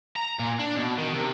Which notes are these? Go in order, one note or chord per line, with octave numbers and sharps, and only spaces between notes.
A#5
A#2
D4
B2
D#3
C3